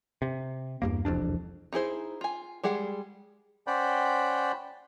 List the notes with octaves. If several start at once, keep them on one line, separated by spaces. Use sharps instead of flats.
C3
E2 G2 A#3
E1 C2 F2 D4
D#4 E4 G#4 C5
F4 G#5
G3 G#3 G#4 F#5
C#4 C5 D5 F#5 G5 B5